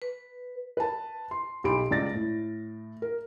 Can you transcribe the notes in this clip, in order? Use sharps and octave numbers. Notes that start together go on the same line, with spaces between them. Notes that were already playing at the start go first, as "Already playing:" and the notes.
B4
B4 A5
C6
B1 G4 B5 C6 D7
C#2 D5 A6 A#6
A2
A#4